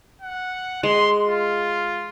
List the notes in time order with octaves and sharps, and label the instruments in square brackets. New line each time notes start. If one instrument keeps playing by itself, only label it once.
[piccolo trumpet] F#5
[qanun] G#3 [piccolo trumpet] C6
[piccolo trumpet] F4